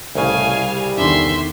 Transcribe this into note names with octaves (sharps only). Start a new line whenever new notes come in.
C2 A2 C#3 G#4 F5 G#5
G3
E2 D3 D#3 E5 C6